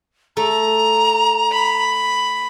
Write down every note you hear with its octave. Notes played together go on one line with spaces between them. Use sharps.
A3 A#5
B5